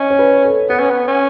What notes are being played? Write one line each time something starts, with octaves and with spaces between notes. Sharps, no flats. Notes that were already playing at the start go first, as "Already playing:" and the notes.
Already playing: C#4 C#5 D#5
C#5
B4
A4
B3 B4
C#4
B3
C#4